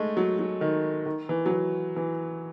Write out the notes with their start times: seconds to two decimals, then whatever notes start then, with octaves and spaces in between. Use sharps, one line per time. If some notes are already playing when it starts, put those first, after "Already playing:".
Already playing: G#3 A3
0.17 F#3
0.39 F#3
0.61 D#3
1.06 D#3
1.29 E3
1.46 F#3
1.51 E3
1.96 E3